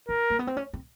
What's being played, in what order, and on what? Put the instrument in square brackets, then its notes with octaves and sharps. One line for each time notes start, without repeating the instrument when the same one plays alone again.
[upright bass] D4 [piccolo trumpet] A#4
[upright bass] A#3
B3
C4
C#4
C4